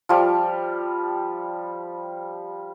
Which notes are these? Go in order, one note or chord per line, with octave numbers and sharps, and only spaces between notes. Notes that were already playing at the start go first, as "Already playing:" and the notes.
F3 G3